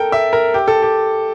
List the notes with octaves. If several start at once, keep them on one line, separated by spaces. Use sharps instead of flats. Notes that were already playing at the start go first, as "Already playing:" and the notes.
Already playing: A4 A#4 G5
E5
A#4
G4
A4
G4